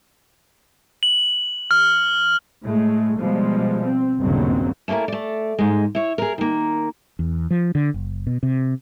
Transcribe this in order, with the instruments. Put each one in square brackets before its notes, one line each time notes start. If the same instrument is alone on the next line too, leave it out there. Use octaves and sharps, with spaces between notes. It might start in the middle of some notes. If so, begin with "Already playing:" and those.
[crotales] F#7
F6
[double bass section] A2 G#3 A3
B2 F3 G3 G#3
C4
G1 D#2 A#2 C#3 F#3 C4
[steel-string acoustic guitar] A3 A#3 C#4 E4 A#4
A3 D5
G#2 G#3
E4 C#5
G#4 A#4
D#3 A#3
[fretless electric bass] E2
F3
D3
F#1
B2
C3